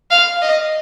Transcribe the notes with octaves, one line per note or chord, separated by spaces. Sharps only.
F5
D#5